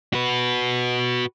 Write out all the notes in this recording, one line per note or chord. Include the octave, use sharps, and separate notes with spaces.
F#4 B4